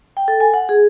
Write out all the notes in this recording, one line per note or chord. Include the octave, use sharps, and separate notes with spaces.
G5
A4
G#5
F#5
G#4